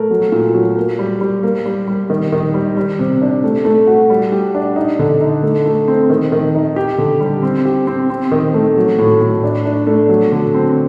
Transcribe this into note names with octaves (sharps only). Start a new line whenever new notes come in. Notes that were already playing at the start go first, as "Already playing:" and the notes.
Already playing: A3 A#4
F#3
A#2
F#3
A#3
G3
G3
A#3
G3
G3
D#3
D#3
G3
G3
C3
D4
A3
A3
F#4
G3
G4
D4
D#4
D3
D#4
A3
A3
C4
D#3
D#3
D#4
G4
D3
G3
C4
G4
C4
C4
D#3
A3
F#3
A2
A2
D4
D4
A3
F#3
D3
C4